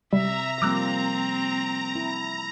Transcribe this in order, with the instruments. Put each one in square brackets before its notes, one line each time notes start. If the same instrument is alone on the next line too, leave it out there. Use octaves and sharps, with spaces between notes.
[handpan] C3 [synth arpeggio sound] G3 [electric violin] E5 [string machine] A#5
[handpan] F3 G3 A#3 [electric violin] C4 [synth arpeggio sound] D6 E6 F#6
[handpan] E4